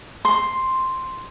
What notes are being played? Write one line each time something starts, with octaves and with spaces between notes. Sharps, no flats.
C6